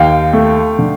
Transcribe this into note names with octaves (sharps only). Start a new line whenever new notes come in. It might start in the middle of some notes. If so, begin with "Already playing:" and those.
Already playing: D#2 F5 G5
A3
D3